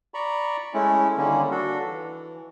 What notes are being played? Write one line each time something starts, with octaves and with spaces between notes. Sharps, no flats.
D5 A#5 B5 C#6
G#3 A3 C#4 E4
D3 D#3 G3 A#3 C#4
D4 F#4 A4
E3